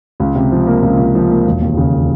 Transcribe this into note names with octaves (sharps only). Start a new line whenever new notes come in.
C#2
C3
F3
A#3
C#2
C3
F3
A#3
E1
D#2
C#3